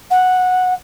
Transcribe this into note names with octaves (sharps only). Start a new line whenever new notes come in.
F#5